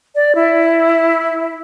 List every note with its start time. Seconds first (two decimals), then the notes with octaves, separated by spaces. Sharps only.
0.15 D5
0.35 E4